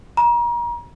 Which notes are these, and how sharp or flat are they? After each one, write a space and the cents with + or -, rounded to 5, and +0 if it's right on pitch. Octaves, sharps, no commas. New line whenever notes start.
A#5 +35